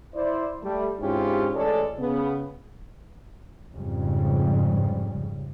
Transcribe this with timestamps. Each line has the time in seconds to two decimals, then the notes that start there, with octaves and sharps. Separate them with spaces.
0.14 E4 C5 D5
0.63 G3 A3
1.00 G#2 C4 C#4 E4 F4 G4
1.54 A1 G#3 C#4 A4 C#5 D5
1.98 C#3 B3
3.73 F2 G#2 C#3 G3